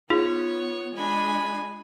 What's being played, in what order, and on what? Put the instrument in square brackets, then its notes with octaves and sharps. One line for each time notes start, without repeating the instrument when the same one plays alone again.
[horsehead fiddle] B3 [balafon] D#4 G#4 [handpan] F4 [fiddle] C#5
[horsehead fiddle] G#3 D4 [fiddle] G#5 B5